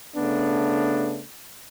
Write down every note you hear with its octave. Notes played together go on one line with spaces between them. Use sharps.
C#3 A3 B3 D4